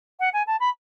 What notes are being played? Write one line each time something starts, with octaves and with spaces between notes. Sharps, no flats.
F#5
G#5
A5
B5